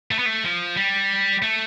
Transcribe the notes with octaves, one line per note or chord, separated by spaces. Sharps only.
A3
B3
A3
F3
G3
A3